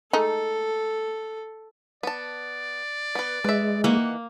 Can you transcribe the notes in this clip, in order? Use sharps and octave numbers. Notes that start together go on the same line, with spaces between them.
G#3 A3 D#4 A4
B3 D5 A5
B3 B4
G#3 B4 E5
D#3 E3 A#3 F#5